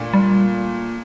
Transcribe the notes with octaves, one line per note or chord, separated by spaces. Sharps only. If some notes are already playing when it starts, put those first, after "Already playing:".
Already playing: A#2 A3 D4
G3